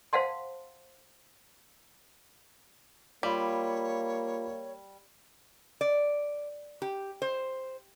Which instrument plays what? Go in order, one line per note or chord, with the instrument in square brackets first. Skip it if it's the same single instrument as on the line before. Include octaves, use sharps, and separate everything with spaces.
[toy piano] C5 F5 F#5 A5 C6
[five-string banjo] G3 [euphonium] A#3 [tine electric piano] F4 B5 [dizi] C#5
[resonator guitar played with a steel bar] D5
G4
C5